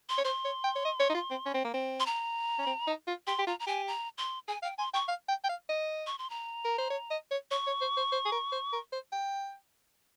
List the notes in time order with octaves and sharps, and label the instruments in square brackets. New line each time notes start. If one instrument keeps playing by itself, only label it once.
[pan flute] C6
[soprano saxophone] C#5
[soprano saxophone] C5 [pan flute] C6
[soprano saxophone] C#5
G5
C#5
D#5
C#5
D#4
F4
C4
C#4
C4
A#3
C4
[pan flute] C6
A#5
[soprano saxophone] C#4
C4
D#4
F4
[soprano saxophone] G4 [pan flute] C6
[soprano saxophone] G4
[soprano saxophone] F4 [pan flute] A#5
[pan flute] A#5
[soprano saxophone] G4 [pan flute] G#5
[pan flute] A#5
C6
[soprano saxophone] G#4 [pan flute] G#5
[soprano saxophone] F5 [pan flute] G5
[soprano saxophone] G#5 [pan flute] C6
[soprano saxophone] G5 [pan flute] C#6
[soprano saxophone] F5
G5
G5
F5
D#5
[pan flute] C#6
C6
A#5
[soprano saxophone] A#4
C5
C#5
D#5
C#5
[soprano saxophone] C#5 [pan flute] C#6
[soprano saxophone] C#5
C5
C5
C5
G#4
A#4
C5
A#4
C5
G5